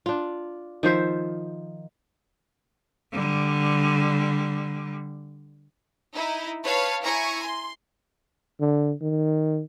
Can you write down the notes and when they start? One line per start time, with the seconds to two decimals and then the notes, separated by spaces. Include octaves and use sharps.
0.06 D4 F4
0.83 D#3 F3 C5 E5
3.12 D3 G3
6.14 D#4 E4
6.64 B4 C#5 F5 A5
7.02 E4 G#5 A#5 C#6
7.43 C6
8.60 D3
9.02 D#3